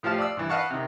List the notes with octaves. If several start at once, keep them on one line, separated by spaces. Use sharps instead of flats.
A2 F3 G4 F5 A5 F6
D5 F5 D#6 E6
G2 E3
B4 D#5 F5 F#5 A5 C#6
C3 D#3